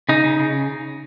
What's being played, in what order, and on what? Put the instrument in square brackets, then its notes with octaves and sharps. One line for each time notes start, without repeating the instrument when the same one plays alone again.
[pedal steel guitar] C#3 D#4
C#3
C#3